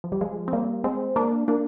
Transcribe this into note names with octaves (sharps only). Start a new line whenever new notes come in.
F3
G3
F3 G#3
C4
G3 A#3
G#3 C4
A#3 D4
A#3 D4